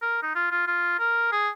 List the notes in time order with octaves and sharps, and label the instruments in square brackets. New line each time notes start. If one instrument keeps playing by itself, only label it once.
[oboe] A#4
D#4
F4
F4
F4
A#4
G#4